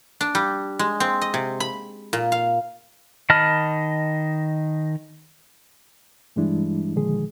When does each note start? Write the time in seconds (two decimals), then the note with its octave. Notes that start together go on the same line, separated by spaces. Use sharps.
0.21 D4
0.35 G3
0.79 G#3
1.00 C4
1.21 D#5
1.34 C3
1.60 B5
2.13 A#2
2.32 F5
3.30 D#3 D#5 A5 B5 F6
6.36 G2 E3 G3 G#3 D4 E4
6.96 A#2 D3 D#3 F3 G#3 G#4